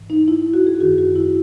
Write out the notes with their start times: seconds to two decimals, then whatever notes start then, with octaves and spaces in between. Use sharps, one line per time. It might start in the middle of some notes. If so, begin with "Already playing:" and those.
Already playing: G#2 E3
0.10 D#4
0.28 E4
0.53 F#4
0.67 G#4
0.80 F#2 D#3 F#4
0.98 F#4
1.16 E4